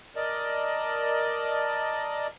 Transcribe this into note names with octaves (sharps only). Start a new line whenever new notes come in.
A#4 D5 D#5 A5